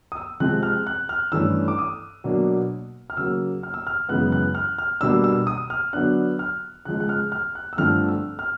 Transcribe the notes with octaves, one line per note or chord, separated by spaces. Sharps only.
D#6
E6
C3 F3 G#3 C4 F#6
F6
F#6
F6
G2 E3 A3 C#4 E6
D6
D#6
B2 F#3 A#3 D4
F6
C#3 F#3 A#3 C#4 E6
F6
E6
F6
F#2 C#3 E3 G#3 B3 F#6
F#6
F6
F6
B2 G3 A#3 D4 E6
E6
D#6
F6
D3 F#3 B3 D4 F#6
F6
C#3 F3 G#3 F#6
F#6
F6
F6
F#6
E6
G2 D3 F3 A3 C4 F6
E6
F6